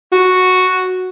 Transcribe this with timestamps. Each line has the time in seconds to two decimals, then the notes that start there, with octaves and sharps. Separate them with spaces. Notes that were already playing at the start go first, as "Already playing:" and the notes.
0.12 F#4